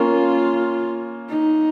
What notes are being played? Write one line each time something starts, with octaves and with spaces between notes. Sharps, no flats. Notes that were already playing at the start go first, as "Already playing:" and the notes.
Already playing: A#3 C#4 F4
D#4